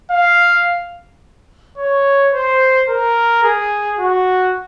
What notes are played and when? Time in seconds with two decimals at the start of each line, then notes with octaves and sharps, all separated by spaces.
0.11 F5
1.78 C#5
2.33 C5
2.88 A#4
3.44 G#4
3.99 F#4